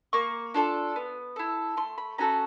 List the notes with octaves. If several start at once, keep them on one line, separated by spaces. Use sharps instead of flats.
A#3 C#6
D4 F4 A4
B3
E4 A4
A3 C6
B5
C#4 F#4 A4 A#5